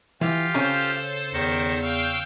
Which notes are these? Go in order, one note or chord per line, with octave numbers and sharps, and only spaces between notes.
E3 F4 G4 F5
C#3 C#4 A4 C5 A#5
E2 D#3 A#4 C#6
F5 G5 C#6 E6